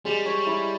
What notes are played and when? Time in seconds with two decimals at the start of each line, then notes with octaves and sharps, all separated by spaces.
0.05 G3 G#3
0.26 C#5
0.46 E4